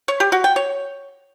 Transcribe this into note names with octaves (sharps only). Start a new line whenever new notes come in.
C#5
G4
F#4
G5
C#5